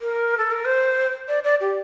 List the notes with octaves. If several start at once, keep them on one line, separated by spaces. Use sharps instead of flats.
A#4
A4
A#4
C5
D5
D5
G4